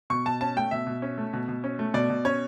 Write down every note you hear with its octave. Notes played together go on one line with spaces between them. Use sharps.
B2 C#6
B2 A5
C#4 A5
A3 G5
B2 E5
B2
C#4
A3
B2
B2
C#4
A3
B2 D5
B2
C#4 C#5